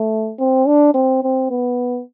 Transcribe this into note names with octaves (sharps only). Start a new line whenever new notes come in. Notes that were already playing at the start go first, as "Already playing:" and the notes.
Already playing: A3
C4
D4
C4
C4
B3